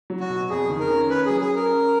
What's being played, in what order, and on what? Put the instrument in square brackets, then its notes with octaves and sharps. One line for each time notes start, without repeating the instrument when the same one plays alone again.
[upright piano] F#3
[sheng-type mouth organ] F#4
[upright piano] B2
[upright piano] F2 [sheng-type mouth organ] G#4
[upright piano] D#3
[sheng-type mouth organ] A#4
[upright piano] C#4
[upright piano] C#4 [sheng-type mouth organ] B4
[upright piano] F#3 [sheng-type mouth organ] G#4
[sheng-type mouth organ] G#4
[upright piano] C#4 [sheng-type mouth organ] A#4
[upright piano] C#4